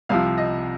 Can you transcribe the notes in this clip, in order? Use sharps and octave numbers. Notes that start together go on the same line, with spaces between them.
C2 C3 F3 F5
D#5